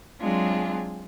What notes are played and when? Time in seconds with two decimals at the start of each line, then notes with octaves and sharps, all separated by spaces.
0.21 F#3 G#3 C4 D4 F4 G#4